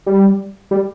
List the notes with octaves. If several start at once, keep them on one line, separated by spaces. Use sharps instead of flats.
G3
G3